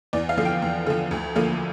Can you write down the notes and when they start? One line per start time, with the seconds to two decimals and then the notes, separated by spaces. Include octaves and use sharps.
0.13 E2 D5
0.29 F5
0.37 D3 F3
0.45 G5
0.62 E2
0.86 D3 F3
1.11 D2
1.36 D3 F3 A#3